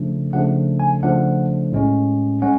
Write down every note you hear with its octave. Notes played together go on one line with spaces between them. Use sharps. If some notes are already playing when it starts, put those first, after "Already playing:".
Already playing: C#3 F3 A3 D4
C#3 F3 A3 D4 F#5
G#5
C#3 F3 A3 D4 F#5
A2 G#3 C#4
G#3 C#4 F#5